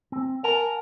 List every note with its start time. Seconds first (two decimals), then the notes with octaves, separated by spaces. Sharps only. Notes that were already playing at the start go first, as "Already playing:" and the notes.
0.12 C4
0.44 A#4 F#5 G#5 A5